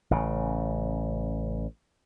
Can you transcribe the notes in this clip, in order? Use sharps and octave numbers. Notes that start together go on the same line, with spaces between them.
A1 C#3